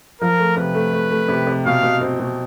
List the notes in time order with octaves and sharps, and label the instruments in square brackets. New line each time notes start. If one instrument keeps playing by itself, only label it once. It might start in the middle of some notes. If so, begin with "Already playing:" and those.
[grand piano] F3 [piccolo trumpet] A#4
[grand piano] A3
[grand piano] C3 [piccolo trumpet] B4
[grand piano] A3
A3
A3
C3
C3
[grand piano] B2 [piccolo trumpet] F5
[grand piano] B2
C4
B2